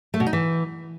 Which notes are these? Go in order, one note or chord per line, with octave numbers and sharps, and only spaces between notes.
A3
B2
D#4
E3